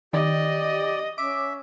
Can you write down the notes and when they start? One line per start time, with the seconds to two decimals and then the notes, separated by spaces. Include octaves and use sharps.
0.13 D#3 G4 D5 D#5
1.18 C#4 E5 D6